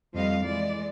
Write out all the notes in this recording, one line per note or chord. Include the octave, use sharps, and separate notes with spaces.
F2 F3 G3 D#5 F5
E3 G#3 D5